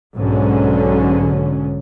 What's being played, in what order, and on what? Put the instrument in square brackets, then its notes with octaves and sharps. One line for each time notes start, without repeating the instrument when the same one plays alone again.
[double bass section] B1 G#2 D3 F#3 C#4